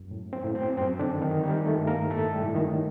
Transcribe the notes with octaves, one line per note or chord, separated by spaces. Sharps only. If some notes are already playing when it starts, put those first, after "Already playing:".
Already playing: F#2
A2
C4
A2
C4
F#2 C4
D3 D4
D#3
D#3 D#4
D#3 G3 G4
A3 A4
G2
A#3 A#4
A2 A3 A4
G3 G4
A2
D#3 D#4